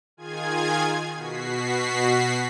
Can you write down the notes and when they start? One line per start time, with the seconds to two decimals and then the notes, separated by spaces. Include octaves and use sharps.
0.17 D#3 F4 G#4 G#5 G#6
1.15 B2 F#4 B6 C7